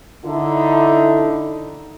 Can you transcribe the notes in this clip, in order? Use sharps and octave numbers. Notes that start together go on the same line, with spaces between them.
D3 D#4 E4 A4